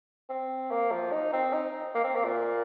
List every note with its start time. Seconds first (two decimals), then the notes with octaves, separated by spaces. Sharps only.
0.29 C4
0.71 A#3
0.92 F3
1.12 D#4
1.33 C4
1.53 D#4
1.95 A#3
2.04 C4
2.15 A#3
2.24 A#2